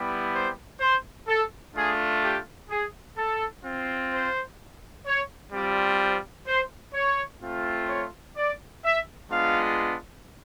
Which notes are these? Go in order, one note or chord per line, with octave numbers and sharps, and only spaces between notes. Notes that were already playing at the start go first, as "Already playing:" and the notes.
Already playing: G3 B3 E4 G4
C5
C5
A4
A3 D4 F4 G#4
G4
G#4
A4
C4 F4
C5
C#5
G3 C4 F4 D5
C5
C5
C#5
A3 C4 F4
C#5
D5
E5
G#3 B3 D4 F4 F5